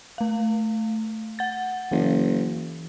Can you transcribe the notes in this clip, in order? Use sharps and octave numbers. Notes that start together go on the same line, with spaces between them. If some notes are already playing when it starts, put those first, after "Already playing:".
A3 F5
F#5 A6
F#1 E3